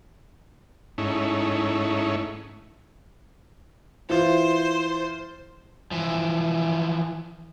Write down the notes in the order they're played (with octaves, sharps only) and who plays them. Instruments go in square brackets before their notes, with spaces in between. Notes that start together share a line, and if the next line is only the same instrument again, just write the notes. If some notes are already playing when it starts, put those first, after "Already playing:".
[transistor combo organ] G#2 A3 C#4 D#4 E4
[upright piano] E3 F4 [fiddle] C5
[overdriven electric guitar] E3 F3